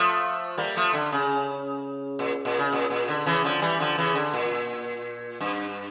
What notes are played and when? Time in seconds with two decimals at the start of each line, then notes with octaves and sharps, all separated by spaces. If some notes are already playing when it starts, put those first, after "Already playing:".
Already playing: F3 A3
0.58 G3 A#3
0.77 F3 A3
0.93 D3
1.12 C#3
2.19 A#2
2.45 A#2
2.59 C#3
2.73 A#2
2.90 A#2
3.08 D3
3.26 C#3 E3
3.44 D3 F3
3.62 E3 G3
3.80 D3 F3
3.98 C#3 E3
4.15 D3
4.34 A#2
5.41 G2